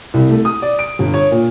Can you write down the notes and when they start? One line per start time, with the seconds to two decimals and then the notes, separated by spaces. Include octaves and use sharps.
0.14 C2
0.30 A3
0.45 D#6
0.62 D5
0.79 D7
0.99 G1
1.14 C#5
1.31 A#2